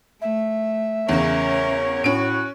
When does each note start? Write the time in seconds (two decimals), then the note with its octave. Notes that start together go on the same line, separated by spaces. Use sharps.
0.21 A3 E5
1.09 E2 C#3 C#4 A#4 C#5
2.04 A2 C#4 F#4 D7